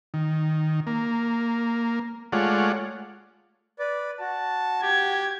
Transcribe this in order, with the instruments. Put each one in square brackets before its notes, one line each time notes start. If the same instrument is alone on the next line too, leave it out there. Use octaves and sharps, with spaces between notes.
[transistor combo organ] D#3
A#3
G#3 A3 F4 C#5 D5 F#5
[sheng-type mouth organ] B4 D5
[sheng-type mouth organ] F#4 [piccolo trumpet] A5
[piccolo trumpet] G4 [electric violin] G#6